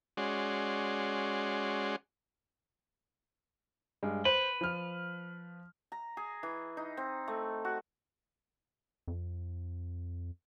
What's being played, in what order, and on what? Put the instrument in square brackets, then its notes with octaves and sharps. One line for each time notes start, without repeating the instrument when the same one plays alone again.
[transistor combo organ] G#3 C#4 F#4 D5 C6
[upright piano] G2 G#3
[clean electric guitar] B4 [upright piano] C5
[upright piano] F3 F6
[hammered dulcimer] A#5
G#4
E3
D#4
C4
A3
F#4
[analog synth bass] F2